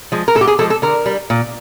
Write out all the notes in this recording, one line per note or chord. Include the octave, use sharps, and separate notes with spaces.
F3 G#3
A#4
A2 A4
G4
G#4
F3 G#3 A4
A4
D3 A#4
G3
A#2